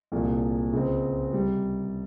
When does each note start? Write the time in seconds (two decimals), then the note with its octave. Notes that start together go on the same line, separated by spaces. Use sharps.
0.12 C2 A#2 F3 G#3
0.73 C#2 C#3 G#3 C4
1.33 C3 G3